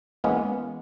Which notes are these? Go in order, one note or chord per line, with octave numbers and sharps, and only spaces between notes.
E3 G#3 A#3 B3 C#4